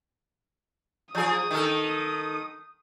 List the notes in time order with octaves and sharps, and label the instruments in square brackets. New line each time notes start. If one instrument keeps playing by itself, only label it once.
[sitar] F3 G#4 [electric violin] D#6
[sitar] D#3 A4